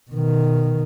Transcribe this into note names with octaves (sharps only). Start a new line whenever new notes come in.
B2 D#3